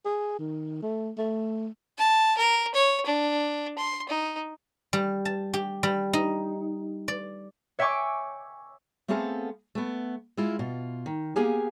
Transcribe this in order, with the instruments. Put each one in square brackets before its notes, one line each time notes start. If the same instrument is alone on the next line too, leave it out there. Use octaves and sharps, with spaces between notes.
[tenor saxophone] G#4
D#3
A3
A3
[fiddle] A5
A#4
C#5
D4
C6
D#4
[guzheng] G3
A5
G4
G3
D#4
D5
[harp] C#5 E5 G5 G#5 C#6 D6
[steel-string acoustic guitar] A3 B3 C4 G#4 A4 F5
A3 B3
G#3 E4 F4
B2 F4
D#3
A#3 B3 G4 G#4 F5 G#5